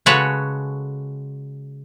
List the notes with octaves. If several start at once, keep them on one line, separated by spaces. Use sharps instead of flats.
C#3 G#3 F#4 A4 B4 C#5